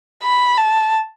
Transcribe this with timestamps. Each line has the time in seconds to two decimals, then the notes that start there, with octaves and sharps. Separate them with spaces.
0.23 B5
0.58 A5